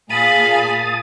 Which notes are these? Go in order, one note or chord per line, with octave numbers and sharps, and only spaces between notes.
A#2 G#4 F5 A5 B5 D#6